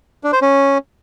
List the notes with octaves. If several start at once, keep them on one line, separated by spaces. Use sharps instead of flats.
D4
C5
C#4